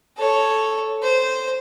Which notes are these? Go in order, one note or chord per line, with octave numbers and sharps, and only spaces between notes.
A4 C#5
C5